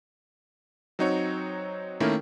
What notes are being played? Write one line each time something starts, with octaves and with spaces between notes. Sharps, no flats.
F#3 C4 D#4 F#4 C#5
D#3 A3 A#3 C#4 E4 A#4